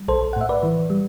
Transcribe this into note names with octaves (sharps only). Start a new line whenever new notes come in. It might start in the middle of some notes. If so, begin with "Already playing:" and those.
Already playing: G3
B1 A4 C5
F#5
A2 E5
B4 D5
E3
G3